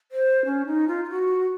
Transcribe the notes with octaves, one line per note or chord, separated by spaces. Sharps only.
C5
C#4
D#4
F4
F4
F#4